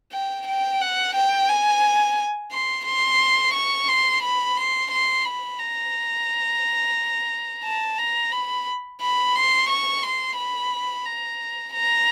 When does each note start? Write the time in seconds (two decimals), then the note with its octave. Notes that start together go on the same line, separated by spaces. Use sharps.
0.12 G5
0.47 G5
0.81 F#5
1.15 G5
1.49 G#5
2.52 C6
2.86 C6
3.54 C#6
3.88 C6
4.23 B5
4.57 C6
4.91 C6
5.25 B5
5.59 A#5
7.64 A5
7.98 A#5
8.32 B5
9.01 B5
9.35 C6
9.69 C#6
10.03 C6
10.37 B5
11.05 A#5
11.74 A#5